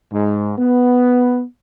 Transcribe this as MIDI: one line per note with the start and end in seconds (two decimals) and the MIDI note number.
0.12 0.53 44
0.58 1.42 59